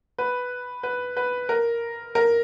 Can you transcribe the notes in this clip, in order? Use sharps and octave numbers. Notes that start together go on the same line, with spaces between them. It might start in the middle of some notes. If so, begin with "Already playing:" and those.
B4
B4
B4
A#4
A#4